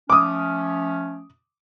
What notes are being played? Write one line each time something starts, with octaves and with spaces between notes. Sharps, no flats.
F3 A3 C#4 D6 D#6